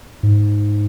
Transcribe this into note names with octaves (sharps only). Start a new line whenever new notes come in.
G#2